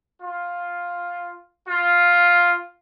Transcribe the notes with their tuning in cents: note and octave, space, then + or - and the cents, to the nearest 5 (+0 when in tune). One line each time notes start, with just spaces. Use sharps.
F4 +5
F4 +5